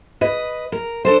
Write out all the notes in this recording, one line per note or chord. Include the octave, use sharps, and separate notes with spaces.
B4 D#5
A#4
D4 A4 C5